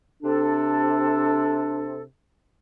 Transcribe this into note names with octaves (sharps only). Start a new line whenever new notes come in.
C3 D4 A4